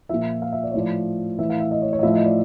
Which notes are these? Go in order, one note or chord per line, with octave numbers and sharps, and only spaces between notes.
A#2 F3 E5
F5
E5
D5
C#5
A2 F3 D5
A2 E3 E5
F5
E5
D#5
C#5
C#5
D#5
A2 F3 E5
D#5
D5